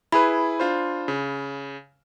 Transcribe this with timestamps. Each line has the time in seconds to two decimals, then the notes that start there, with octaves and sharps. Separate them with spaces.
0.12 E4 G#4 B4 B5
0.60 D4 F4 C5
1.08 C#3